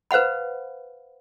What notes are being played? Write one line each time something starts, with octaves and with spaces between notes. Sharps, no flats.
B4 C5 F5 F#5 B5